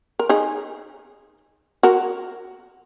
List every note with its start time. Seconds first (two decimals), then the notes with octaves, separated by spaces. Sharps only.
0.19 A#4
0.29 D#4 G#4
1.83 F#4 A#4